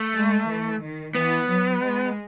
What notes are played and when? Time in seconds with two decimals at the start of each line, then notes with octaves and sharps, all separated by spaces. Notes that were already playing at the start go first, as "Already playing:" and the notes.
Already playing: A3
0.15 G#3
0.48 E3
0.82 D#3
1.15 E3 B3
1.48 F#3
1.82 G#3